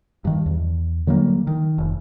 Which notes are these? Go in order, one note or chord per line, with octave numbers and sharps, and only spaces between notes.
G2 D#3
E2
D3 F#3 G3 A#3
D#3
F1